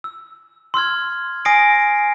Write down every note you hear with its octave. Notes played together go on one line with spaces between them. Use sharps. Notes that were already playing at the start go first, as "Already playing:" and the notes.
E6
C6 E6 F6 G#6
G#5 D#6 A#6 C7 D7